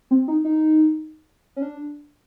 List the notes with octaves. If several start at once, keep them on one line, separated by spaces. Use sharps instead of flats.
C4
D#4
D#4
C#4
D4